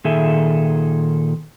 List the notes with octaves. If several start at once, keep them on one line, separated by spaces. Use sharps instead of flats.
A#2 D#3 G#4 A4 E5